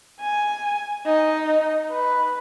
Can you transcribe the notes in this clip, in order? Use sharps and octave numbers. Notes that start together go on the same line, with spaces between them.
G#5
D#4
B4